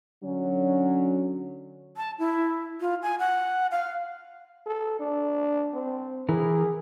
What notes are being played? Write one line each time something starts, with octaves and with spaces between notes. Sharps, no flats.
D3 F#3 C#4
A5
E4
F4
G#5
F#5
F5
A4
D4
C4
E3 E4 G#4 A#4